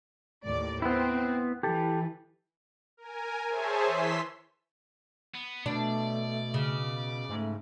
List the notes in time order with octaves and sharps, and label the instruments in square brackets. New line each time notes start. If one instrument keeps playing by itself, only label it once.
[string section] D#2 A2 D5
[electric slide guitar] B3 E4 [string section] C4
[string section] E3 [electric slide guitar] G4 A4
[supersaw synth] A#4 G#5
G#4 C5 C#5 E5 G#5 A5
E3 C6 E6 B6
[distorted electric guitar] B3
[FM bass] B2 [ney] A3 [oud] D4 [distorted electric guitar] D5
[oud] C#3
[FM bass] G#2 [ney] A3